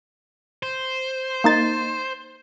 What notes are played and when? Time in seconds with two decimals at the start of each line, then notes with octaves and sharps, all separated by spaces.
0.63 C5
1.44 A#3 D#4 A6